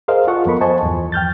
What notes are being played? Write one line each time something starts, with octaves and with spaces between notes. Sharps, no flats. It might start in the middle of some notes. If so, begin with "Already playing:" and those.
G#4 A#4 C5 D#5 F5
F4 A4 D#5 F#5 C#6
F2 F3 B3 A#4 B5 C#6
C5 D#5 G#5 A5 C#6
E2 G2 F3
G5 F6 G6 A6